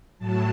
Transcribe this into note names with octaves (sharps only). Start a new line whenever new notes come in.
A2 F#3 A5